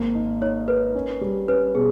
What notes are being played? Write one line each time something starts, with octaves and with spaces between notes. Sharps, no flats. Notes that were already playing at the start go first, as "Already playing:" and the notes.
Already playing: G#1 A#3
D#4
D#4 C#5
A#4 B4
C#4
G3
C#4 B4
B2 G#4